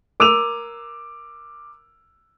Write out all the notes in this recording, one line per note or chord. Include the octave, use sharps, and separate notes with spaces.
A#4 D6 E6 D#7 F7